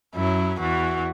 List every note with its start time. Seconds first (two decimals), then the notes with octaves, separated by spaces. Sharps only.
0.15 F#2 F#3 E4
0.60 E2 E3 F#4